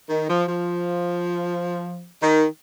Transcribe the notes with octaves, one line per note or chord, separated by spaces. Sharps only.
D#3
F3
F3
D#3